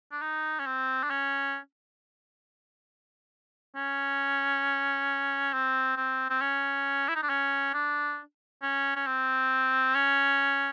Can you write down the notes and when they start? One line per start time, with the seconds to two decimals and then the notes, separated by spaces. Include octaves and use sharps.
0.12 D4
0.22 D#4
0.60 C#4
0.66 C4
1.03 D4
1.10 C#4
3.76 C#4
5.53 C4
5.97 C4
6.30 C4
6.41 C#4
7.09 E4
7.16 D#4
7.23 D4
7.29 C#4
7.74 D4
8.62 C#4
8.96 C#4
9.06 C4
9.95 C#4